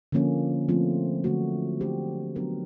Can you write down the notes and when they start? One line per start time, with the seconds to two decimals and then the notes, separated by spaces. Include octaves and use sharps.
0.12 D3 F3 A#3 C#4
0.69 F3 A3 C4 F4
1.24 D3 F#3 A3 C#4 F#4
1.80 A3 D4 G4 C5
2.36 F#3 B3 D4 F#4 A#4